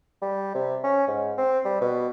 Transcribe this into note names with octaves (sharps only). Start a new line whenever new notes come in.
G3
C3
C#4
G#2
C4
G3
B2